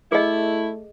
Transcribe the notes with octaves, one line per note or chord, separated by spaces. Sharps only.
A3 E4 G#4 D#5